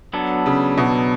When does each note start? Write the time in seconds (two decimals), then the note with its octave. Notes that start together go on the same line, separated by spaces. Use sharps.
0.13 F#3 B3 D4 A4
0.46 C#3
0.77 B2